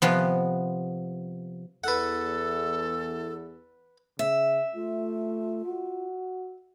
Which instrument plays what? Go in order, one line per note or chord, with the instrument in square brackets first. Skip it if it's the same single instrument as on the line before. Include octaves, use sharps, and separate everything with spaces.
[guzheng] C3 F3 B3
[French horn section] E2 [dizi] A4 [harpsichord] B4 F#5
[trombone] C#3 [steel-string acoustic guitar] E5
[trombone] A3 [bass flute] F4
[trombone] F#4